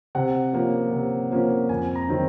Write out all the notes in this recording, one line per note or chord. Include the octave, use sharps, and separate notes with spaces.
C3 F#5
F3 A#3 C#4
C3
F3 A#3 C#4
F2 G#5
A#5
D#3 F#3 C4